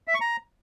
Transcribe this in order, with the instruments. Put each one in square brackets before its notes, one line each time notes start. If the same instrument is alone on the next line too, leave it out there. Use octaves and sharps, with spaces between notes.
[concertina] E5
C#6
A#5